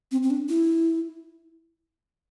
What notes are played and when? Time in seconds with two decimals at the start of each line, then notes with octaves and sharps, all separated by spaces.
0.12 C4
0.23 C4
0.30 D4
0.49 E4